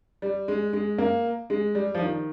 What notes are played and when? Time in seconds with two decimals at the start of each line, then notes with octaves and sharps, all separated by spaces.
0.22 G3
0.48 G#3
0.73 G#3
0.98 A#3
1.50 G#3
1.75 G3
1.95 F3
2.01 D#3